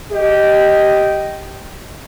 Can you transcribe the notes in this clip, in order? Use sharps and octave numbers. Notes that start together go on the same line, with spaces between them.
G4 D#5